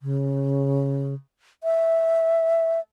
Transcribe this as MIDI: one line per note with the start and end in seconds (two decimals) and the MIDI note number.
0.01 1.14 49
1.64 2.80 76